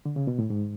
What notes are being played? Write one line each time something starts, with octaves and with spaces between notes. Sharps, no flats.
D3
C#3
B2
A2
G#2